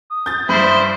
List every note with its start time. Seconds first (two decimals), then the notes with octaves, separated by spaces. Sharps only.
0.11 D#6
0.26 G6 A6
0.49 G2 E4 C5